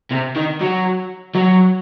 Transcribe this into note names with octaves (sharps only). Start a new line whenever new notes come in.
C3
D#3
F#3
F#3